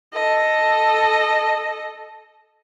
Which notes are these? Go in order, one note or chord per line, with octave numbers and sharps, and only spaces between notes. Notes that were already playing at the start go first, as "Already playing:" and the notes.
A4 D#5